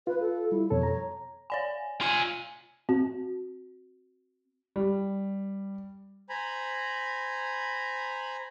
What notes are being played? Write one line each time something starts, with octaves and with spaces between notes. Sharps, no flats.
F4 B4
A4
G3 E4
F2 B2 A4 C#5
A#5
C#5 D5 G#5
F4 G#5 C7 D#7
C4 F#4
G3
C5 G#5 A#5 B5